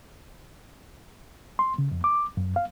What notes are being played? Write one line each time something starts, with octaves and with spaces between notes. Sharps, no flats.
C6
C#3
F2
D6
F#2
F5